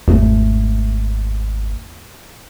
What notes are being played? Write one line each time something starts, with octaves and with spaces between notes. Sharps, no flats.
G#1 E2 A3